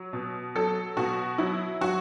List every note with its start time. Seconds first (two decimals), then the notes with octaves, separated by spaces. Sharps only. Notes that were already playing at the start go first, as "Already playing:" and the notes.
Already playing: F#3
0.13 B2
0.55 F#3 A4
0.97 B2 F#4
1.38 F#3 E4
1.81 F#3 F#4